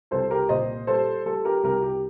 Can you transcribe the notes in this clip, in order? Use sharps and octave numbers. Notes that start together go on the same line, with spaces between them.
C2 A4 C5
G4 A#4
A#2 C5 D#5
G3 A4 C5
G3 A4
G4 A#4
C2 G4 A#4
G4